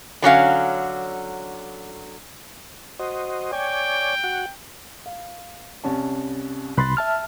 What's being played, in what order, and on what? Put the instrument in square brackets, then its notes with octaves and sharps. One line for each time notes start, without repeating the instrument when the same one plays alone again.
[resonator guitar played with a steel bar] D3 F#3 C#4 F5
[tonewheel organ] F#4 C5 D#5
[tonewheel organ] C#5 D5 G#5 [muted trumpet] G5
[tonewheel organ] F#4 F#5
[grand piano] F5
C2 C#4 A5
[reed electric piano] C2 B5 C6 [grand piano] F#6 A6
[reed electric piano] E5 A5 F6